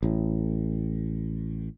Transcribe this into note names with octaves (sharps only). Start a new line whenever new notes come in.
A1 A2